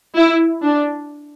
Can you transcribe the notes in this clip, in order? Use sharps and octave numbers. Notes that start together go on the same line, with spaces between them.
E4
D4